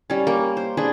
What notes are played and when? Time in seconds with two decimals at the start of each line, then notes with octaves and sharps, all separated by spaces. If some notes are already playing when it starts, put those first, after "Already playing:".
0.10 G3 C#4
0.27 A#3
0.57 C5
0.77 D4 G#4 B4